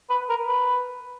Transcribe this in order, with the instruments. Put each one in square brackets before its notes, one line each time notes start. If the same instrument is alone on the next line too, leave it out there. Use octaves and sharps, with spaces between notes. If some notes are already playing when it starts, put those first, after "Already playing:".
[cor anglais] B4
A#4
B4